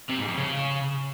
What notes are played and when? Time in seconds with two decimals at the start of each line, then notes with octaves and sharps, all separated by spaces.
0.10 C3
0.19 G#2
0.28 F2
0.38 C#3